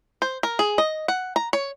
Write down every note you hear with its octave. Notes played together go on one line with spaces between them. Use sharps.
C5
A#4
G#4
D#5
F#5
A#5
C#5